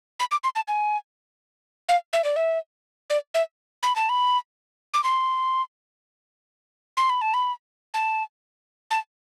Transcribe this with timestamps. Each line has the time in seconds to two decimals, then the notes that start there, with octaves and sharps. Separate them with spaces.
0.20 B5
0.32 D6
0.44 C6
0.56 A5
0.68 G#5
1.89 F5
2.13 E5
2.24 D5
2.36 E5
3.10 D5
3.34 E5
3.83 B5
3.96 A5
4.09 B5
4.94 D6
5.04 C6
6.97 C6
7.10 B5
7.22 A5
7.34 B5
7.94 A5
8.91 A5